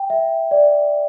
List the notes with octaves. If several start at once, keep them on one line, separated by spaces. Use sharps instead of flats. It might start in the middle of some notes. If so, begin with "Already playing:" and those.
Already playing: G5
E5
D5